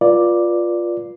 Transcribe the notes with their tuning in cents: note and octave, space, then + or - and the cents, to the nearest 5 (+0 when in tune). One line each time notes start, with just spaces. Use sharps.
F4 +0 B4 -25 D5 +0